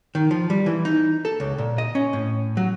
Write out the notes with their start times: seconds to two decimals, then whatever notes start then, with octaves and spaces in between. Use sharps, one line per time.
0.15 D#3
0.31 F3
0.50 G3
0.66 E3
0.85 D#4
1.25 A4
1.40 C#2
1.58 A#2
1.78 D#5
1.95 C#4
2.13 A2
2.57 F#3